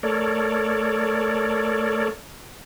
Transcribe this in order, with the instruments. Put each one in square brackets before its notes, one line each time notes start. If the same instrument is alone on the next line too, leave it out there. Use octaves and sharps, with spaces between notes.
[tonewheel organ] A3 A4 A#4 C#5 D5